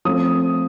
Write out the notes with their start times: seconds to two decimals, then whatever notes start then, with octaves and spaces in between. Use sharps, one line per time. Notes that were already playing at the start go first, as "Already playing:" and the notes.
0.05 F3 A3 C4 D#6